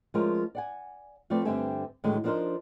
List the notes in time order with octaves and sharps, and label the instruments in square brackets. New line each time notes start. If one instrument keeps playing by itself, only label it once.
[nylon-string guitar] F3 G#3 A3 C#4 F4 A#4
D5 F#5 G#5
F3 A3 C4 B4 D5
G2 D3 C4 G4 E5 G#5
A2 D3 D#3 F#3 G#3 A3
F3 B3 D4 D#4 A#4 C5